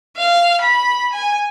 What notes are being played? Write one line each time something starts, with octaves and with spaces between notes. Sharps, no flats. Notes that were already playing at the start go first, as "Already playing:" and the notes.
F5
B5
G#5